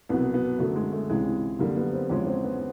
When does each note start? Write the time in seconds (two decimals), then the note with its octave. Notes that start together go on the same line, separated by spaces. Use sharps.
0.09 C2 B2 F#3 B3
0.34 B3
0.59 F#2 D3 F#3 A3
0.76 G#3
0.92 A3
1.10 C#2 C3 E3 G#3
1.59 F#2 D3 G3 A#3
1.77 B3
1.93 C4
2.09 E2 C#3 F3 G#3 C#4
2.27 C4
2.44 B3